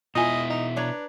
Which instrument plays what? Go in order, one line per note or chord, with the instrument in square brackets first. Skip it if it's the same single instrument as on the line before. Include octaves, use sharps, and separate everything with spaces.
[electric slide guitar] B2 E4 [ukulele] F4 G#5 [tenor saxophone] D#5
[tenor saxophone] D#4
[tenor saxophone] D4 [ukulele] B4 C#5 A#5